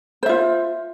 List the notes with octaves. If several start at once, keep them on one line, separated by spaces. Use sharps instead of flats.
F4 C5 E5